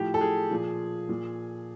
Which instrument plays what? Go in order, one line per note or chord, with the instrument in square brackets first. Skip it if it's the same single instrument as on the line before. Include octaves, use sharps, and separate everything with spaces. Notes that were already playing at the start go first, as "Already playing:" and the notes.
Already playing: [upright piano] A2 F3 G4
A4
G#4
A#2 F3
A#2 F3